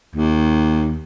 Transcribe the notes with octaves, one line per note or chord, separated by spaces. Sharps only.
D#2